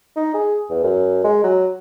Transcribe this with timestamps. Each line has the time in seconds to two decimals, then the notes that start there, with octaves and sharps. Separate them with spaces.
0.16 D#4
0.34 G#4
0.70 E2
0.83 F#2
1.24 G#3
1.44 F#3